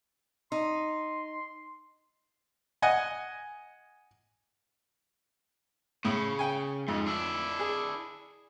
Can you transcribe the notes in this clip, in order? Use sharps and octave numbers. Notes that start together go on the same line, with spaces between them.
D#4 C6
D#5 F#5 G#5
A2 C#3
G5 G#5
F2 G#2
D4 E4
G#4